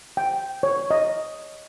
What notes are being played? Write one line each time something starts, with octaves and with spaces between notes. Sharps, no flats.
G5
C#5
D#5